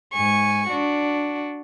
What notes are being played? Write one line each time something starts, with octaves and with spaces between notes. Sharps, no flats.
G#2 G#5 C#6
D4 F#4